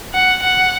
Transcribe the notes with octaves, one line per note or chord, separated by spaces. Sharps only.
F#5
F#5